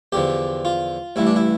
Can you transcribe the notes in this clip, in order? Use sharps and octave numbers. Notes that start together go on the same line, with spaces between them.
E2 D3 F3 G4
F4
A1 G2 E3 E4
D4
E4